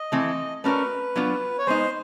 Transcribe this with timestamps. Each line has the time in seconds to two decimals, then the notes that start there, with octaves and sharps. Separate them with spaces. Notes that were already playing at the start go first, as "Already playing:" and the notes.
Already playing: D#5
0.12 E3 A3 C4
0.64 A3 C#4 F#4 A#4 B4 D5
1.16 F#3 B3 D4 F4
1.58 C#5
1.67 G#3 B3 D#4 C5